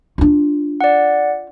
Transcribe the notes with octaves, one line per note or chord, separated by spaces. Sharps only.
D4 F4
D5 F#5